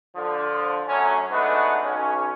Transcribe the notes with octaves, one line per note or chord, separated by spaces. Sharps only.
D3 F3
F#2 F#3 A3 C#4
G#3 A3 B3 D4 D#4 F#4
B1 C#4